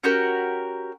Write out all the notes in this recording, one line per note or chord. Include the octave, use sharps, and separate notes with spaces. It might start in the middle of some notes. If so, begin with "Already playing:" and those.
C#4 F#4 G4 A#4